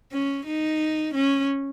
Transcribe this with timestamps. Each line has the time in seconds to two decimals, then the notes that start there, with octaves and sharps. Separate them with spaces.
0.12 C#4
0.46 D#4
1.15 C#4